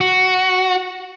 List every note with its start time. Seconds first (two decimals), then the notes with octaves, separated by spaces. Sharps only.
0.01 F#4